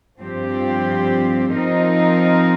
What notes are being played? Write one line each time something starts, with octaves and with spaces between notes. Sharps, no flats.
G2 F3 C4 G4
F3 C4 D#4 A#4